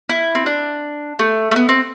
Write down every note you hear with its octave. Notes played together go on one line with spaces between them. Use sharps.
E4
C4
D4
A3
A3
B3
C4